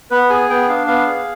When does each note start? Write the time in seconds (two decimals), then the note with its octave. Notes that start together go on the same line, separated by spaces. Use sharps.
0.10 B3 B4
0.30 G#4 G#5
0.50 B3 G5
0.69 D4 F5
0.87 B3 F5
1.06 G#4